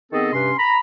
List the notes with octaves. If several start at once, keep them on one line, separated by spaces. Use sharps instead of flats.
D#3 B3 C4 G#4 A4 D#5
G2 C3 C#4 B4 C6
A#5 B5